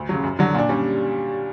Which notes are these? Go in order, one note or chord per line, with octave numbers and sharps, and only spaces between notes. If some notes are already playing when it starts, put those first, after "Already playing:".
Already playing: D2
C#3 F#3
F#2
D3 F#3
A#2 D4
G3 C#4